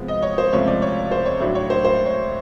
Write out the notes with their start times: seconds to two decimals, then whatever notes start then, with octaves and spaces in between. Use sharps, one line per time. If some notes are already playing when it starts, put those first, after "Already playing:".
Already playing: C3 F3 G#3 B3
0.08 D#5
0.22 C#5
0.38 C5
0.53 C#2 C3 F3 A3 C#5
0.68 D5
0.82 C#5
1.11 C5
1.26 C#5
1.40 A2 F#3 A3 D4
1.55 C#5
1.70 C5
1.85 C5
2.06 C#5